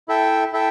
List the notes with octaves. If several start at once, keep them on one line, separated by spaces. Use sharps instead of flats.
E4 A4 E5 G5
E4 A4 E5 G5